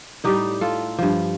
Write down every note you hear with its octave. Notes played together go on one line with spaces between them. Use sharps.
A2 G3 D#4 G4
F4 A4
G2 F3